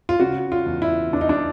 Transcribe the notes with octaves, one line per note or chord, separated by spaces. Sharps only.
F4
C#3 F#4
F4
E2
E4
E2 D4
D#4
D4